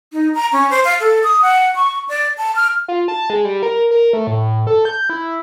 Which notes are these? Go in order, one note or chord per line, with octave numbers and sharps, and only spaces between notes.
D#4
A#5
C#4
C5
F5
A4
D#6
F#5
C#6
D5
A5
F6
F4
A5
G#3
G3
A#4
A#4
A3
A2
A4
G6
E4